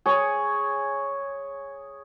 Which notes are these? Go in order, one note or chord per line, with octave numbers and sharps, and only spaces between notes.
G#4 C#5